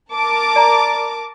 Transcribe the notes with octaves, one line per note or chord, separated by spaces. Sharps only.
A#4 A5 D6
D5 A#5